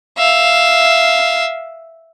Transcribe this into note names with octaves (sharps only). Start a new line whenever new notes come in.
E5 F5